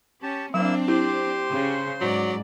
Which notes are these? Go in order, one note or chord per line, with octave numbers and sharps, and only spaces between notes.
C#4 G4 A5
F#3 A#3 C4 D4 E4 E6
E4 G4 C5 C6
C#3 C#4
G#2 F#3 D5